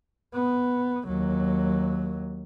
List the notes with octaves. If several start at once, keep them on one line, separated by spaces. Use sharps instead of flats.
B3
D#2 F#3